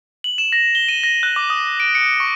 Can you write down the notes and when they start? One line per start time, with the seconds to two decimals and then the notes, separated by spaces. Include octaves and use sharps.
0.24 F#7
0.38 E7
0.52 A#6
0.75 G7
0.89 D#7
1.03 A#6
1.23 F#6
1.36 D6
1.50 D#6
1.80 D7
1.95 C#7
2.20 C#6